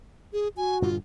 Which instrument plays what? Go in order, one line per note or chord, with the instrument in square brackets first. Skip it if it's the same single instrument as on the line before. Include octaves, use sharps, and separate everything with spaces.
[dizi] G#4
[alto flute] F#4 [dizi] G#5
[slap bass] G2 A#2 D3 [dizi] F4